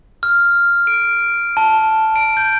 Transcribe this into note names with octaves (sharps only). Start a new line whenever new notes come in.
F6
D7
A5
D7
G6